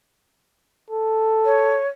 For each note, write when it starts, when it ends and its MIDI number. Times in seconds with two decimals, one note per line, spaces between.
0.90 1.80 69
1.45 1.86 73